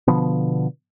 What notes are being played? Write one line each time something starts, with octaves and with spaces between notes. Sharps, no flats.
B2 D3 F3 B3